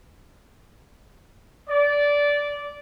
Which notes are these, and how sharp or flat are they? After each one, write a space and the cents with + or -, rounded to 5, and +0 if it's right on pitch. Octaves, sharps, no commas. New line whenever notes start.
D5 -15